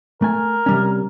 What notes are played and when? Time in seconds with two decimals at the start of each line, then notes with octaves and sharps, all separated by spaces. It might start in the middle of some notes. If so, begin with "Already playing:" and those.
0.22 A3 A#4 G#5
0.66 C3 G3 C#4